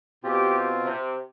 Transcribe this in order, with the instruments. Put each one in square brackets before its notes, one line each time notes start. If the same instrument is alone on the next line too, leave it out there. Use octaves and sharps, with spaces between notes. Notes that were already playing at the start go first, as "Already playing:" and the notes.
[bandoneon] B2 C4 F4 [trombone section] G4
[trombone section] C3